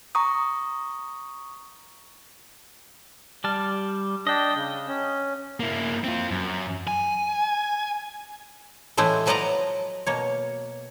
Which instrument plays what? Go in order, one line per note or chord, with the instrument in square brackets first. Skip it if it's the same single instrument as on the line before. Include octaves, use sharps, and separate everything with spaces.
[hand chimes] A#5 C#6 D#6
[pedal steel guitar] G3 A5 F6
[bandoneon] D4 [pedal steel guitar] D#5 G5
[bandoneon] C#3
C#4
[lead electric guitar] A#3 E4
C4 F4
F#2
G#5
[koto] A2 E3 G#3 A3 E4
F3 F#3 B4 D5 D#5 A#5
B2 A#3 C#5